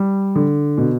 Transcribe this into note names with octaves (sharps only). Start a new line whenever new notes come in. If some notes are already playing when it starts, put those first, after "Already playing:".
Already playing: G3
D3
B2